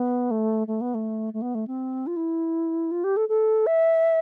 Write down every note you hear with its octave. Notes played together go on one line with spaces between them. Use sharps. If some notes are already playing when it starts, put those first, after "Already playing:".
Already playing: B3
A3
A3
B3
A3
A3
B3
A3
C4
F4
E4
F4
G4
A4
A4
E5